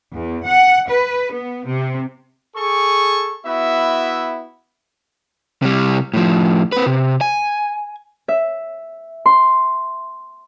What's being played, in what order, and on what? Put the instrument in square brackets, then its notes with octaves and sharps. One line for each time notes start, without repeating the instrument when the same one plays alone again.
[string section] E2
F#5
B4
B3
C3
[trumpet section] G#4 A4 C#6
B3 E4 F#4 E5
[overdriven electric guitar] C3 G3
A2 F3
C4 B4
C3
G#5
[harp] E5
C6